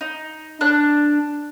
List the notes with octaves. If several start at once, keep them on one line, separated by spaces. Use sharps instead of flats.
D#4
D4 F#6